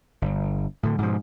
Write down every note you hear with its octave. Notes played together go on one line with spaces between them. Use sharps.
G1
A2 D3
G#2 B2 F3